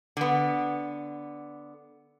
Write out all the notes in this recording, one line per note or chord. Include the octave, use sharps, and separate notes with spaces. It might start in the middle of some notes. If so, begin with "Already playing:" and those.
D3 B3